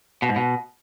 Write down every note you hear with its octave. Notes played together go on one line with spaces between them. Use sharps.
B2
G#2
B2